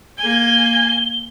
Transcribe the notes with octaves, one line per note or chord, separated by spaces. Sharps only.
A#3 G#5 G7